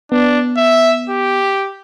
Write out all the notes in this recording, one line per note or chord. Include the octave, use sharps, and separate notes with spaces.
B3 D4
E5
G4